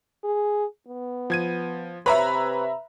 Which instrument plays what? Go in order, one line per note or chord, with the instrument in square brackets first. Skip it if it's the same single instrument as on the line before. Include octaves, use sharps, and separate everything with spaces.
[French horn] G#4
B3
[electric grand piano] F3 G#6 D#7
[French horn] C3 [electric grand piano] B4 C#5 [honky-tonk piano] E5 A#5 B5